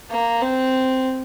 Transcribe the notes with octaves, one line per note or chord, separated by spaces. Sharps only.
A#3
C4